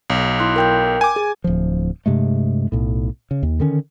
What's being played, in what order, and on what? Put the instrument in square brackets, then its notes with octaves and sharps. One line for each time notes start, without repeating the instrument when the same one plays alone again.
[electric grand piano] B1
[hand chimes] E4 C6 F#6
A#4 G5 G6
[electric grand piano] G#5 D6
[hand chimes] G#4
[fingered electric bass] D1 F3
G2 C3 G#3 A3
B1 A2
C#3
D#2
D3 D#3 C#4